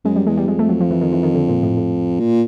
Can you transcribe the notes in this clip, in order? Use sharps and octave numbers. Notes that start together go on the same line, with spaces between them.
F#2 G#3
G3
E2 G#3
G3
F2 G#3
A3
F#3
F3
E3
D#3
E3
D#3
D3
A#2
A2
A2
A#2